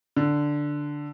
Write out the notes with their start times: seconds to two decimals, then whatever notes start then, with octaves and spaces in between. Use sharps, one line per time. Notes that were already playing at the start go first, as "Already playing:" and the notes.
0.17 D3